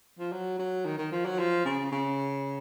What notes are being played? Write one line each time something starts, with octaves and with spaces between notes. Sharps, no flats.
F3
F#3
F#3
D#3
D#3
F3
F#3
F3
C#3
C#3